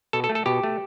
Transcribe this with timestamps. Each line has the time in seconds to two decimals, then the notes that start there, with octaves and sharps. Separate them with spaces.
0.13 B2 A4
0.24 A4
0.29 A3
0.35 A4
0.46 B2 G4
0.63 A3